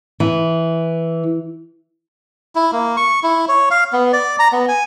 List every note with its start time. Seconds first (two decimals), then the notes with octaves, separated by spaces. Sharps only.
0.20 E3
2.55 E4
2.72 A#3
2.97 C#6
3.23 E4
3.48 C#5
3.71 F5
3.93 B3
4.13 D5
4.39 A#5
4.52 B3
4.68 G#5